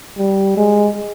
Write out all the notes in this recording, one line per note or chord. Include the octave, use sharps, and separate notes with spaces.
G3
G#3